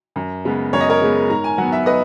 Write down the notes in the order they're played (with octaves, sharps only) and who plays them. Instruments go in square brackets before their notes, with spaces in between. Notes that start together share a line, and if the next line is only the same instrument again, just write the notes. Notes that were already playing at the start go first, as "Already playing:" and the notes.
[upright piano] F#2
C#3 G#3 B3
F#2 C#5
D#5
A#4 C#5
C#3 G#3 B3
G#2 A#5
G#5
F#3 B3 F#5
E5
B4 D#5